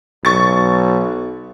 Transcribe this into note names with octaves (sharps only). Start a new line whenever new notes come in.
B1 C#6 A6